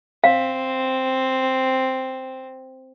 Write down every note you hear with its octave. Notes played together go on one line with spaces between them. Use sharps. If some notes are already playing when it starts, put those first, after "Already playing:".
C4 F5